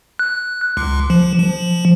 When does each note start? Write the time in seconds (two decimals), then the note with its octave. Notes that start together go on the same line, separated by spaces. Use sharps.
0.19 F#6
0.77 C#2
1.10 F3
1.39 F3